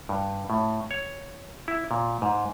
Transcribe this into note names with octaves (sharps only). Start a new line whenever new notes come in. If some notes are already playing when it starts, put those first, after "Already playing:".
G2
A2
C#5
E4
A#2
G#2